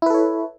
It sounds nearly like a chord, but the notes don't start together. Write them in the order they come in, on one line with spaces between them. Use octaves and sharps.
E4 B4 A4 C#5